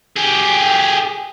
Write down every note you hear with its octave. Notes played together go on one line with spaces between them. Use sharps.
G4 G#4